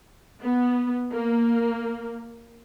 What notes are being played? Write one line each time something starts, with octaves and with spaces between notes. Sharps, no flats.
B3
A#3